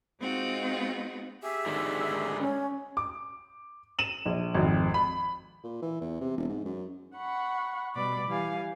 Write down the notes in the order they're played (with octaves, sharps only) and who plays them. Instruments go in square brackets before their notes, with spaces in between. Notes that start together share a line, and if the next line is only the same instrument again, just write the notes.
[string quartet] G#3 C4 D#4 F4 F#4
[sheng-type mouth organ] G4 G#4 [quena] E5
[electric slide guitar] G#2 D3 D#3
[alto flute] C#4
[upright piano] D6
D#7 E7 F#7
A#1
G#1 F2
B5
[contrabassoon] A#2
E3
E2
C3
E1
G#2
F#2
[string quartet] F#5 B5 C#6
B2 G3 D5 B5 D6
E3 G3 F5 G#5